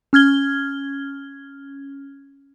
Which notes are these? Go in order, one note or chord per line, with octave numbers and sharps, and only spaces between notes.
C#4 F6 G#6 G7